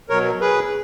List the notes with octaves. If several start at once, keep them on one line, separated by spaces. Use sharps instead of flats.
B2 F#3 A#4 C#5
G#4 B4